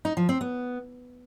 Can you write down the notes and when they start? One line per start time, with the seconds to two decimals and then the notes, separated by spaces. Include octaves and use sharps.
0.05 D#4
0.17 F3
0.29 C4
0.41 B3